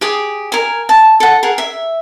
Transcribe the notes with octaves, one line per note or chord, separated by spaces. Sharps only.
G4 G#4 D6
A#4 G#5
A5
A4 F#5
G#4 A#4 F#5
E5